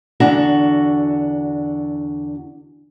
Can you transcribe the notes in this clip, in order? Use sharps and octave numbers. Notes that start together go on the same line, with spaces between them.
E2 D3 D4 F#4 A#5